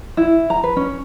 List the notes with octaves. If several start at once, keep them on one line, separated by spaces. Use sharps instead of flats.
E4
A#5
B4
C#4